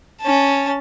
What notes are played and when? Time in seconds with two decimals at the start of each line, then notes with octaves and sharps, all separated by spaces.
0.22 C#4 A5